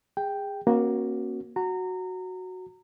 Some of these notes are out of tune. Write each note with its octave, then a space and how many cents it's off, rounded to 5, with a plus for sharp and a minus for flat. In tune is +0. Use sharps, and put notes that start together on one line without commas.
G#4 -25 G5 +0
A#3 +15 C#4 -30 F#4 +0
F#4 +0 A#5 -25